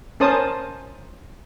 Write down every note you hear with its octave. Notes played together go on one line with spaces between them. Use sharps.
C#4 A#4 C5 A5 D#6